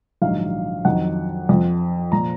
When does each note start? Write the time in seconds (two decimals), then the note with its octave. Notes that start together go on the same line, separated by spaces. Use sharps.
0.22 A#1 G#2 D#3 F#3 F5
0.85 F2 D#3 F#3 F#5
1.49 F2 F3
2.12 A#2 F3 A#5